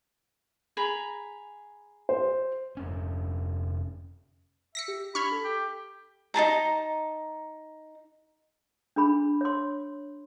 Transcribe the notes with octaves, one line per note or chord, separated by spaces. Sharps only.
G#4 A#5 B5
C5
F1 F2 C#4
E5 A#6 B6 C#7
G4
D4 B5 C#6 F6 G#6
A4
G4
D#4 G#4 A5 A#5
D4 G#4 B5
C#5 C6